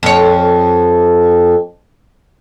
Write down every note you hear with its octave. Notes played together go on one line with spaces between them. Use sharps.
F2 C#5